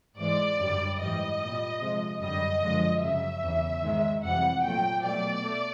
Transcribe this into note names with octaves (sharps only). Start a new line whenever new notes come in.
G#2 E3 G#3 D5
F#2 D3 G3
G#2 E3 G3 D#5
G3
A#2
C3 F3 G#3
F#2 D3 G3 D#5
F#2 D3 F3 G#3
F#2 C#3 F#3 E5
E2 C#3 E3
G#2 D#3 G#3
F2 C3 E3 G3 F#5
A#2 F#3 A3 G5
B2 F#3 A3 D5
A3